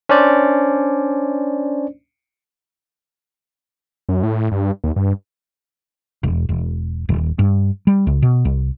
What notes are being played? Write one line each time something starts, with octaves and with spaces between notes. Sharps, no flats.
C#4 D4 C5 D5
F#2
A2
G2
D#2
G2
E1
E1
D#1
G2
G3
C#2
B2
C2